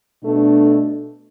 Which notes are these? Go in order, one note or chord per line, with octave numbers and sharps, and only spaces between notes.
B2 A3 D4